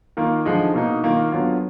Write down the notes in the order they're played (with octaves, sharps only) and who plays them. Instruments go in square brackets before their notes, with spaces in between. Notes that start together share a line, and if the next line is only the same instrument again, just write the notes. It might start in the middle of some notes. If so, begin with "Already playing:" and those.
[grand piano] D#3 A#3 F4
D3 F3 G#3 D#4
B2 A#3 D#4
D#3 A#3 F4
D3 F#3 B3 F4